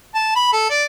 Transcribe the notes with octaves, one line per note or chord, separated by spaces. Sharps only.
A5
B5
A4
D5